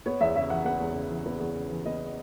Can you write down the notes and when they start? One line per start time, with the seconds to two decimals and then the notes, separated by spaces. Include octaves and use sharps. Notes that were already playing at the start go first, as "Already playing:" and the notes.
0.06 B3 C#5
0.21 E2 E5
0.36 C#3 E5
0.50 E3 F#5
0.65 B3 F#5
0.80 E2
0.95 C#3
1.11 E3
1.26 B3
1.40 E2
1.55 C#3
1.70 E3
1.85 B3 D#5